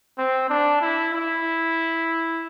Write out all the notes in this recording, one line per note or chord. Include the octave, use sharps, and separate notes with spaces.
C4
D4
E4
E4